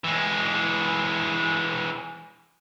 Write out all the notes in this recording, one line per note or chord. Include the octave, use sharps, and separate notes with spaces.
E3 G#3